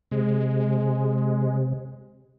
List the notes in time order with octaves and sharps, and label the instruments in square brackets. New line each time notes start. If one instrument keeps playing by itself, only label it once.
[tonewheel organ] C3 [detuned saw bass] G#3